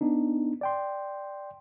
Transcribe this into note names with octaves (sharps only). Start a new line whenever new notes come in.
B3 D4 D#4
D5 G5 C6